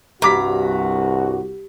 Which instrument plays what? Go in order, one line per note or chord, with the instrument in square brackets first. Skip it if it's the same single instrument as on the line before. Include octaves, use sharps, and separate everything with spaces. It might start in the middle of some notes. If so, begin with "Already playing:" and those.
[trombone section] C2 F#4 [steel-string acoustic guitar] G2 [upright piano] A#5 D6 B6